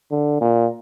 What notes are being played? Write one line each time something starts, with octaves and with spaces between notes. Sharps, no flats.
D3
A#2